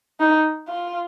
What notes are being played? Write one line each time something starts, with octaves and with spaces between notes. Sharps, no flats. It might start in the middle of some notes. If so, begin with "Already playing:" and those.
D#4
F4